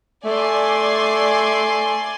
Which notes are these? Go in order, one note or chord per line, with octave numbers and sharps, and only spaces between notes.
A3 D5 G#5 C6